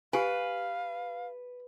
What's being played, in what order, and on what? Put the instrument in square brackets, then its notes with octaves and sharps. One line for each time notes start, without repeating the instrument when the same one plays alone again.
[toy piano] G4 G#5 [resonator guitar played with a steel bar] B4 [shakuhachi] F5